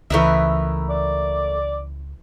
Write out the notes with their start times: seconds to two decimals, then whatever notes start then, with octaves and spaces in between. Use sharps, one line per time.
0.10 C#2 E3 A3 A#4 B4 D#5 E5
0.90 D5